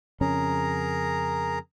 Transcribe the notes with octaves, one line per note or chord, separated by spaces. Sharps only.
F2 C#3 C#4 G#4 A#4 A#5